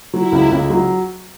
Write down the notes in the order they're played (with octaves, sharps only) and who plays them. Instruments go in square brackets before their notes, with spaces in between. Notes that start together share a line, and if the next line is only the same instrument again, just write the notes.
[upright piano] F#3 [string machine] E4
[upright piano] C#2
C#2
F#3